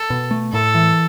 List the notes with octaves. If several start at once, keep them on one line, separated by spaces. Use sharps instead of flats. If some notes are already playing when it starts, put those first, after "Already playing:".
Already playing: A4
B2
A3
A2 A4
E3